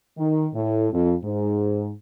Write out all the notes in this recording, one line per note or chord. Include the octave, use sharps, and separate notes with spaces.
D#3
A2
F2
G#2